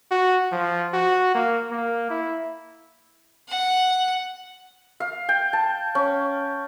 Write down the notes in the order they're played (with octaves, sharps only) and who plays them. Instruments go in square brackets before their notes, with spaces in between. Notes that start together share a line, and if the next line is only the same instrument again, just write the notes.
[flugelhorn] F#4
F3
F#4
A#3
A#3
E4
[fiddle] F#5
[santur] F5
G5
A5
C#4